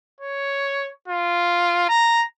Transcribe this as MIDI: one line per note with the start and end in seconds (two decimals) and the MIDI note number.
0.21 0.91 73
1.08 1.89 65
1.89 2.24 82